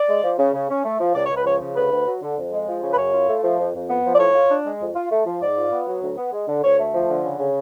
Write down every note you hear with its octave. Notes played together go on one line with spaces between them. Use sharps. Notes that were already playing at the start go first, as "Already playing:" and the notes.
Already playing: D5
G#3
F3
C#3
C#3
C#4
A3
F3
C#2 D5
C#2 C#5
B4
F3 C#5
C#3
D2 B4
D2
F#3
D3
F2
G#3
F3
C#3
B4
F#2 C#5
F4
A3
F3
F2
F2
B3
F3
D5
A2 C#5
F4
D4
G#3
F2
F4
A3
F3
G#2 D5
F4
B3
F#3
D2
B3
G#3
D3
D2 C#5
A3
F3
D3
C#3
C#3